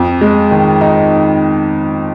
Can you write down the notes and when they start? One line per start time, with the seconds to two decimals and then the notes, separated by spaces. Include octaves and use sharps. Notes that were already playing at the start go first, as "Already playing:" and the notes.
Already playing: F2
0.21 G#3
0.51 D#3
0.81 D#4